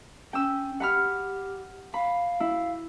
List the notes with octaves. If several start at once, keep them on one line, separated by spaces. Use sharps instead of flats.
C#4 G5 E6
G4 F#5 B5 F6
F5 B5
E4